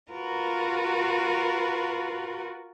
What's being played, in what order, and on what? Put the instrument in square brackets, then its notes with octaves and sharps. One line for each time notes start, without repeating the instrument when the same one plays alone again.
[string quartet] F4 F#4 A#4 B4